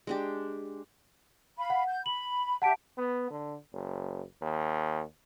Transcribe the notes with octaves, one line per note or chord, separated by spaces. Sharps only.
G#3 D4 G4
F5 B5
F#5
G6
B5 F#7
G4 E5 F#5 A5 D7
B3
D3
F#1
D#2